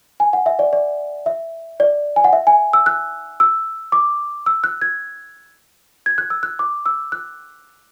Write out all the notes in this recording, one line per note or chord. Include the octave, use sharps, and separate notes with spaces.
G#5
F#5
E5
D5
D5
E5
D5
G#5
F#5
E5
G#5
E6
F#6
E6
D6
E6
F#6
G#6
G#6
F#6
E6
F#6
D6
E6
F#6